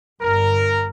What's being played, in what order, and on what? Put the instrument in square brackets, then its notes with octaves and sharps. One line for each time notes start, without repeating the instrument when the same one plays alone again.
[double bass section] G1 G2 [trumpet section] A#4